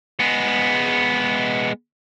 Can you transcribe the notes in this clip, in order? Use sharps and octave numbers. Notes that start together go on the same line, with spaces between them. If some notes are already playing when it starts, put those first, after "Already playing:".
G#3 B3